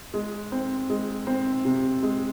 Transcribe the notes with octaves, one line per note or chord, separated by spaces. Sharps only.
G#3
C4
G#3
C4
C3
G#3